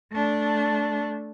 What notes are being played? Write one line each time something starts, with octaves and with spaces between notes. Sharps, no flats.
A3 D4